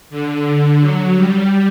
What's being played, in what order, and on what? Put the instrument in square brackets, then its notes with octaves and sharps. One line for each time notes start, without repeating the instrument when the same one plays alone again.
[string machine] D3
F#3
G3